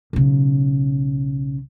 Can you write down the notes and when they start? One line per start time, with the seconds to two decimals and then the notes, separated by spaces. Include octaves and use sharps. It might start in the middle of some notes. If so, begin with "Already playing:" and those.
0.13 B1 C#3